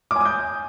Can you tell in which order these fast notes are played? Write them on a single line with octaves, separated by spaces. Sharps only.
D6 G#5 D#6 G6